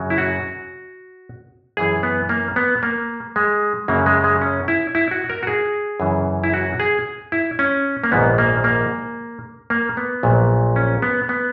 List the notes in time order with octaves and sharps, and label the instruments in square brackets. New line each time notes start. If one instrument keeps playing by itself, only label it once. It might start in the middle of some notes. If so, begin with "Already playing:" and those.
Already playing: [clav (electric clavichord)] F#2 C#3 F#3
E4
F#4
F#2 E3 G#4
B3
A#3
B3
A#3
G#3
F#2 C#3 F#3 A#3
G#3
G#3
C#4
E4
E4
F#4
A#4
F#4
G#4
F#2 C#3 E3
E4
F#4
G#4
E4
C#4
A#3
A#1 G#2 D#3 B3
A#3
A#3
A#3
B3
A#1 A#2 F#3
C#4
B3
B3